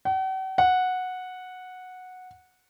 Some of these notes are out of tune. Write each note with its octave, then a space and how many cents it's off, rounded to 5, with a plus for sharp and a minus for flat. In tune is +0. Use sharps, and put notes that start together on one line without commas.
F#5 +45
F#5 -10